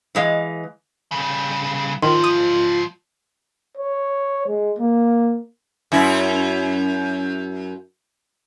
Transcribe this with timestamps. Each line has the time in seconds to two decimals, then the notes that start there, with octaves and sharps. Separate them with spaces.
0.15 E3 G#3 F5
1.12 C#3 G3
2.02 G#2 D#3 F3 F4 C6
2.24 D#6
3.77 C#5
4.47 G#3
4.79 A#3
5.92 F#2 E4